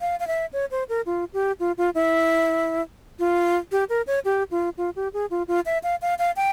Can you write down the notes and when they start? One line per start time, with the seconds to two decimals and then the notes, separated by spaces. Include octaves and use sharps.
0.01 F5
0.20 F5
0.27 E5
0.53 C#5
0.71 C5
0.89 A#4
1.06 F4
1.34 G4
1.60 F4
1.78 F4
1.95 E4
3.19 F4
3.72 G4
3.89 A#4
4.07 C#5
4.25 G4
4.51 F4
4.78 F4
4.96 G4
5.14 G#4
5.31 F4
5.48 F4
5.66 E5
5.83 F5
6.02 F5
6.19 F5
6.36 G5